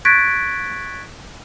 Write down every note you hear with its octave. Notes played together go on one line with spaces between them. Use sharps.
C#6 F#6 G#6 A6 B6 D7